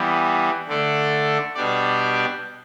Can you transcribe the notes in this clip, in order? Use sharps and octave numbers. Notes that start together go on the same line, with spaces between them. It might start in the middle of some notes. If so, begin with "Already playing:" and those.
Already playing: E3 G3 B3
D3 A3 D4 A4 D5
B2 G3 D4 G4 D5